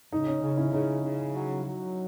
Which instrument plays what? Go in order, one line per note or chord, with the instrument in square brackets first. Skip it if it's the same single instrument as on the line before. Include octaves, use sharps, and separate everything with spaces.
[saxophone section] C#3 [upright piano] D#4
[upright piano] C#4
[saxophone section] C#3
[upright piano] C#4 E4
[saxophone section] C#3 [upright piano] D#4
[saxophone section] C#3
F#3
F#3